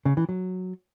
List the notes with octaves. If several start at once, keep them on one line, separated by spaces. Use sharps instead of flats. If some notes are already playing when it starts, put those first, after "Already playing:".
C#3
E3
F#3